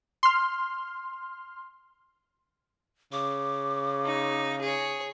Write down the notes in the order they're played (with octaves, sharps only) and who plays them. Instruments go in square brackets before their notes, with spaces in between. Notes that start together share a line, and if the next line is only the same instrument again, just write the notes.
[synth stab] C6 F6
[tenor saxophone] C#3 [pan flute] D6
[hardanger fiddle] D#4
G#4 C#5